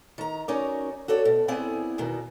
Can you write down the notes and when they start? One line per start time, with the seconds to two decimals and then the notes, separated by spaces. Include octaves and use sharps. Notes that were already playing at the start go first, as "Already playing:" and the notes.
0.18 D#3 A#5
0.48 C#4 D#4 F#4 A#4 D5
1.08 F#4 A4 C#5 D5
1.25 B2
1.48 B3 C4 E4 G#4 D5
1.98 E2 B2 D#3